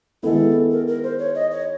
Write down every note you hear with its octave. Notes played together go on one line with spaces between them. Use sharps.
D#3 G#3 B3 E4 A4
A#4
A#4
C5
C#5
D#5
C#5